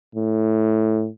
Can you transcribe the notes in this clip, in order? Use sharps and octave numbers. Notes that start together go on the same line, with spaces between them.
A2